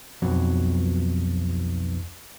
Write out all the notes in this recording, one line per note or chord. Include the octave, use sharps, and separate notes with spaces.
B1 F2 F#3